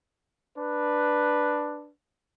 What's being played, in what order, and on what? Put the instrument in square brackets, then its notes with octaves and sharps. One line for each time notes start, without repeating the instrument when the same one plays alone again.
[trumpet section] D4 B4